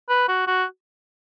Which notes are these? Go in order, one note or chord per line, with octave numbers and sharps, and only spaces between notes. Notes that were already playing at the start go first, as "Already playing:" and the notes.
B4
F#4
F#4